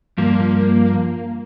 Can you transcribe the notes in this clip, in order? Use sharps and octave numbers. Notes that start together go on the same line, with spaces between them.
G2 F3 A#3